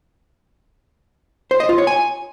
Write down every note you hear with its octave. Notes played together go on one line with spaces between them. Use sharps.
C5
D#5
F4
C#5
G#5